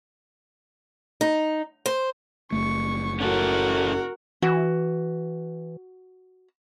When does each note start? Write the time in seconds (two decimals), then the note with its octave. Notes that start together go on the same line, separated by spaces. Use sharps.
1.21 D#4
1.86 C5
2.52 F#1 A3 C#6
3.20 C#4 E4 F#4 A4 A#4
4.42 E3 F#4